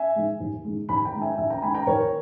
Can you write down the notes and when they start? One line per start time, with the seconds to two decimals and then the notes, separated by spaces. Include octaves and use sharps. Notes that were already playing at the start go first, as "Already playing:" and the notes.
Already playing: E5 G#5
0.15 D#3 G#3
0.40 D#2
0.64 D#3 G#3
0.89 D#2 G#5 B5
1.05 G5 A#5
1.14 D#3 G#3
1.22 E5 G#5
1.38 D#2 E5 G#5
1.50 G5 A#5
1.62 D#3 G#3 G#5 B5
1.74 G5 A#5
1.87 D#2 A#4 C#5